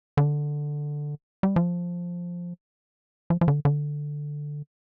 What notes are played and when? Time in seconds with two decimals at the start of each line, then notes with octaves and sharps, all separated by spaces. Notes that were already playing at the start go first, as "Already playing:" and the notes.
0.17 D3
1.43 G3
1.56 F3
3.30 F3
3.41 F3
3.48 D3
3.65 D3